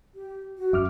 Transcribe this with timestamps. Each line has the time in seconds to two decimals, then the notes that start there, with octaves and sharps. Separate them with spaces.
0.15 G4
0.58 F#4
0.73 F#2 E5 D6 F6